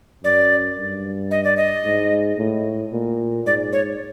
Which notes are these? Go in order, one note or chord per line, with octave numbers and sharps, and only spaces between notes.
F#2 D5
G2
D#5
D5
D#5
G#2
A2
A#2
G#2 D5
C#5